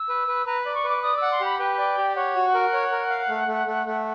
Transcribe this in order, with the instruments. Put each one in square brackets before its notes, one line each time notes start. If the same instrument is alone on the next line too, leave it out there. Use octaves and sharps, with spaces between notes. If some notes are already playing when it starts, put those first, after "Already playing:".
Already playing: [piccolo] E6
[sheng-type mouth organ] B4
B4
[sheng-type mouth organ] B4 [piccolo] A#5
[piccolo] B5
[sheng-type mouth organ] D5
[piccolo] C#6
[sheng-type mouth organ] B4 [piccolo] D6
[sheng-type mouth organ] D5 [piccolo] D#6
[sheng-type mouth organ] F#5 [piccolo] E6
[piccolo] C6
[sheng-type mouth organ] G4 [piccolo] B5
[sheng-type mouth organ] B4 [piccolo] G5
[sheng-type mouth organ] D5
G4
[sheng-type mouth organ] C#5 [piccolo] F#5
[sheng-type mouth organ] F#4
A#4
C#5
A#4
F5
A3
A3
A3
A3